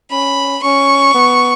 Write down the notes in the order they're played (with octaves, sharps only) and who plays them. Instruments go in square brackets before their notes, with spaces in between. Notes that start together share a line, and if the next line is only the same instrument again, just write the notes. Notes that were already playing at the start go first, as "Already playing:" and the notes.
[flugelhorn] C#4 [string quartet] B5
[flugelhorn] C#4 [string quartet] C#6
[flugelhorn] B3